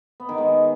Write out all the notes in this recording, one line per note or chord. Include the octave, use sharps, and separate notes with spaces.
B3
D#3
G#3